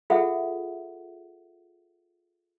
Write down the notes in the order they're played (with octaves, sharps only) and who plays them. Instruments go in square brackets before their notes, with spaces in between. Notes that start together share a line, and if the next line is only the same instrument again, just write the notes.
[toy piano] F4 G#4 A4 E5 F#5